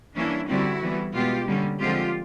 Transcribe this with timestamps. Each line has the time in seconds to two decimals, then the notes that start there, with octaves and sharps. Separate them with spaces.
0.15 E3 G3 A#3 C#4 D4 E4
0.48 D3 G3 C4 E4 F#4
0.81 E3 G3 B3
1.14 B2 G#3 B3 F4 G4
1.47 D3 G3 A#3 C#4
1.80 D3 F3 G#3 C4 F4 G4